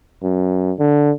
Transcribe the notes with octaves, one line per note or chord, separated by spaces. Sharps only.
F#2
D3